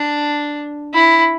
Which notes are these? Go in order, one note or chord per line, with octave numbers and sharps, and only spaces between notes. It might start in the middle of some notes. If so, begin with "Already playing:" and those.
Already playing: D4
E4